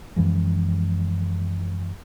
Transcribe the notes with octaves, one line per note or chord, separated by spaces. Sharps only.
F#2 E3 F3 G#3